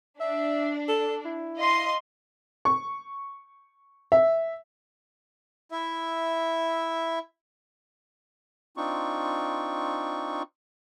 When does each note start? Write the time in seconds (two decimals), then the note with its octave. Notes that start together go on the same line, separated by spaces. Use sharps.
0.20 D4 E5
0.88 A4
1.25 E4
1.59 D#5 F5 C6
2.65 C#6
4.12 E5
5.71 E4 E5
8.77 C4 D4 D#4 F4 C#6